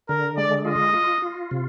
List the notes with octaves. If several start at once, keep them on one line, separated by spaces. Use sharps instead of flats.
D3 A#4
G#3 D5
F4 D#5
F4
F4
C3